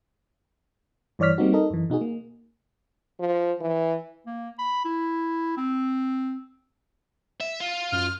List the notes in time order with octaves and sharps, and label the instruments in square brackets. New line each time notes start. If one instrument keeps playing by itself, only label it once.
[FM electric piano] G2 E3 C#5 D5 F6 B6
G3 A#3 C4 D#4 F#4
D#4 A4 A#4 D#5
F#2 E3
B2 D#4 F#4 G#4
A#3
[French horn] F3
E3
[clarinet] A#3
B5
E4
C4
[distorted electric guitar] E5
F4
[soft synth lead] F#2 [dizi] F6